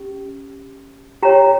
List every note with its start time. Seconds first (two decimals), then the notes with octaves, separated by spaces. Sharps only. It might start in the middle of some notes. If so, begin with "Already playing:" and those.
Already playing: C#4 G4
1.22 G4 C#5 G5 A#5